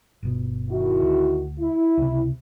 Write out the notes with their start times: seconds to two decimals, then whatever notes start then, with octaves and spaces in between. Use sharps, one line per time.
0.23 G1 B2
0.69 D#3 E4 F#4
1.02 D2
1.58 E4
1.97 C#2 C3